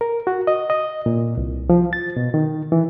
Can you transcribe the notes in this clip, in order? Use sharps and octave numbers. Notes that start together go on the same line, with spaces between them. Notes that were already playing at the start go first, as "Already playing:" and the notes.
A#4
F#4
D#5
D#5
A#2
C2
F3
A6
B2
D#3
E3